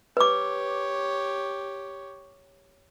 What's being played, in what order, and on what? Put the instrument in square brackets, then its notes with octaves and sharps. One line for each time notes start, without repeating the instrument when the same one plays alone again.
[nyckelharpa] G4 C#5 [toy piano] B4 D6